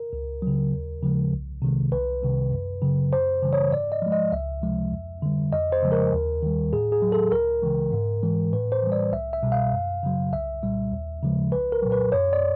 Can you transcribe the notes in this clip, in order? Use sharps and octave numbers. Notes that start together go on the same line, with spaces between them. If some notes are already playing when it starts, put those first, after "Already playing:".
Already playing: A#4
C#2
C#3 F#3
D#2
C#3 F3 G#3
C2
C3 D#3 G#3
C2 B4
C3 D#3 G3
F#2
C#3 F#3
F#2 C5
C#3 E3 G3
C#5
G#2 D5
D#5
F3 G#3
D#5
C#2 E5
C3 F3 G#3
F2
D3 G3
F2 D#5
C5
C#3 F3 G#3
A#4
D#2
D#3 G3
A2 G#4
G#4
F#3
A4
C#2 A#4
C#3 E3 G#3
G#2
E3 G#3
A2 B4
C5
E3 G3
D5
C2 E5
E5
B2 G3
F5
F#2
C#3 F#3
C2 E5
A#2 G3
D#2
C#3 F3 G#3
C2 B4
A#4
A#2 F#3
B4
F#2 C#5
D5